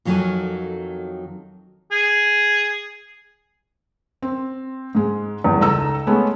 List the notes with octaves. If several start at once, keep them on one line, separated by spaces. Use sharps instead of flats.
F2 D#3 F#3 C#4 A4 G#5
G#4
C4
G#2 G#3
E2 G2
C#2 D#4 A4 A#5 E6
G#3 A3 B3 C#4